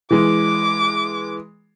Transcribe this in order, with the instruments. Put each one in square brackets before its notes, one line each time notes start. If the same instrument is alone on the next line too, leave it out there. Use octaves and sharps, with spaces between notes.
[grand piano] E3 G#3 [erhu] D6